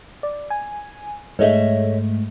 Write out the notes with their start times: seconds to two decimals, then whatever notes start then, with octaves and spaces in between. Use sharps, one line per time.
0.23 D5
0.50 G#5
1.39 G#2 G#3 A3 C#5 D#5 E5